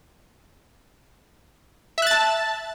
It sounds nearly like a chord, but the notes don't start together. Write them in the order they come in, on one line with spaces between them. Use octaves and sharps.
E5 F#6 A6 A5